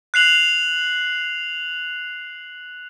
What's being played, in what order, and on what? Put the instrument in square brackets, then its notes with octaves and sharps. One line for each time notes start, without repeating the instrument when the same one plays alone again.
[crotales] F#6 C7 F7 F#7